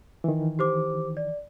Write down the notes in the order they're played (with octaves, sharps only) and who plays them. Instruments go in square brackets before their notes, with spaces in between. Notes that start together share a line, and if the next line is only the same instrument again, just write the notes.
[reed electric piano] D#3 E3
[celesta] G4 C5 D6
D5